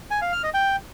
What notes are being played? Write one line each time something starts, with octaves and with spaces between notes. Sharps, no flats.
G#5
F5
F6
D#5
G5